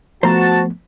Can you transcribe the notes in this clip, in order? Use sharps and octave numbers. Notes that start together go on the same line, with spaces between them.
F3 A3 B3 F#4 C5 A5 A#5